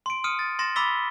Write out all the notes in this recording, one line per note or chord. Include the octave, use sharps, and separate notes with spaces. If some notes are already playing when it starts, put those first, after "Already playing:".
C6 D7
D#6 F6 C#7 D#7
A6
C6 A6 A#6 E7
B5 D6 E6 A6 B6 G7